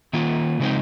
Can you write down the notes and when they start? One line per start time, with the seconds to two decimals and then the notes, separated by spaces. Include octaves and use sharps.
0.13 D#3 A#3 F4
0.59 C#3 F3 G#3 C4 D#4